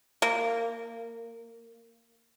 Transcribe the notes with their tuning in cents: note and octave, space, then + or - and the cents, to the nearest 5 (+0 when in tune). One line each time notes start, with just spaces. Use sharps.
A#3 -15